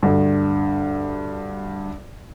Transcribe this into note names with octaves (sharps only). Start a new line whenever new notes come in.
D2 G2